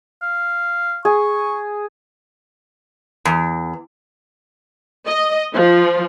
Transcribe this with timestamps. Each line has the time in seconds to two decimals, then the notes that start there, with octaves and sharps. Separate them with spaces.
0.22 F5
1.05 G#4 C#6
3.25 E2
5.06 D#5
5.54 F3